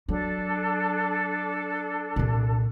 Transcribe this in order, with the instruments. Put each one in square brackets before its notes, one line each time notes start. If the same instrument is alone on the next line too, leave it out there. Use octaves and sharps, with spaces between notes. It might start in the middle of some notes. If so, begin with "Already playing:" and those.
[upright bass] F#3 [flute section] D4 A4
[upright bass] C2 A#2